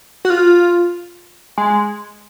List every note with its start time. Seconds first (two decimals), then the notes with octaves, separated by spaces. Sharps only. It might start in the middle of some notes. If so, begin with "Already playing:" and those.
0.25 F#4
0.30 F4
1.58 G#3